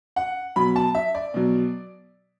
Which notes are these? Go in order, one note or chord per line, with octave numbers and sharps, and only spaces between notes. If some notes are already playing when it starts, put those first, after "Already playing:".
F#5
B2 F#3 B5
A5
E5
D5
B2 F#3